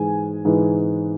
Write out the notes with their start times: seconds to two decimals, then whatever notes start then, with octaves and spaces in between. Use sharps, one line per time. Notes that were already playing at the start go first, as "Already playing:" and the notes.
Already playing: G#2 E3 G#3 G#5
0.45 G#2 E3 G#3